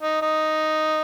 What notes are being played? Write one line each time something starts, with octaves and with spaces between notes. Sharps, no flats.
D#4
D#4